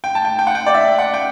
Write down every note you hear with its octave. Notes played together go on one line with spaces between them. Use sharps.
G5
A5
G5
G5
F#5
G5
D5
E5
G5
F#5
G5